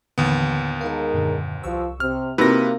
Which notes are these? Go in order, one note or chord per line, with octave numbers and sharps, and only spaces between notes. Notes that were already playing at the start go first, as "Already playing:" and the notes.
D#2 A2 D3 E3 B3
G#3 D#4 A#4 F5 F#5 A5
F#2 A#2 D3
C2 F3 C#6 E6
C3 F6
C3 A#3 D#4 E4 F#4 B4 A#6